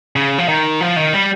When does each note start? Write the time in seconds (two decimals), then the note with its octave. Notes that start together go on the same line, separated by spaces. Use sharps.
0.16 C#3
0.38 F3
0.49 D#3
0.81 F3
0.96 D#3
1.13 G3